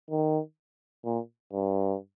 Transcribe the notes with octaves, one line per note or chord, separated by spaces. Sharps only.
D#3
A#2
G2